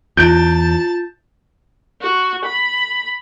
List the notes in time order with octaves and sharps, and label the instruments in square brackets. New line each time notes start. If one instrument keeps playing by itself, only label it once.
[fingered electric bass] E2 [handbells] E4 F4 [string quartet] A5 [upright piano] G6 D7
[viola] F#4
B5